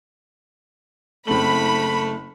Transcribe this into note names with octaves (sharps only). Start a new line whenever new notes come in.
F#1 A3 C4 B5 F#7